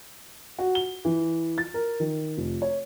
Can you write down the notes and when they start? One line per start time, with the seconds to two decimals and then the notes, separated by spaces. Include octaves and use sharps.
0.59 F#4
0.75 G7
1.05 E3
1.58 A6
1.74 A#4
2.00 D#3
2.38 F1
2.62 C#5